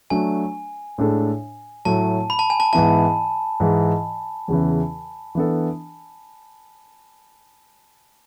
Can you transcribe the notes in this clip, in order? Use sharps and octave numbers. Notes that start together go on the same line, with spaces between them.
F#3 A3 D4 G#5
A2 G#3 D4 A4
A2 F#3 A3 E4 A4 A5
B5
A5
G#5
A5
G#2 E3 B3 E4 A5
G#2 E3 G#3
E2 C#3 E3
E3 B3 D4 A4